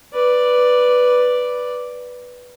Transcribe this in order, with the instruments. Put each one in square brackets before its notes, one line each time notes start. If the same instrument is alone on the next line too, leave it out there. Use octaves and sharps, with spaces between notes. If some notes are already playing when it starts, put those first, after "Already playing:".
[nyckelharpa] B4 D5